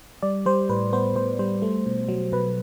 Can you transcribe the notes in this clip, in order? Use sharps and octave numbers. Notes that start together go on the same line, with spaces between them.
G3 D5
G3 C5
A2 B4
B3 C5
A2 C5
G3 C5
A3
B2
F#3
B2 B4